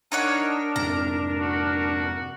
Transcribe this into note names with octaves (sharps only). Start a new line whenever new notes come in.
D4 D#4 A#4 C#5 F#5
F2 G#2 C3 A#5
F#4